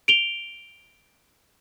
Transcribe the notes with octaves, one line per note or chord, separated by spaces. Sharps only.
D7 F7 G7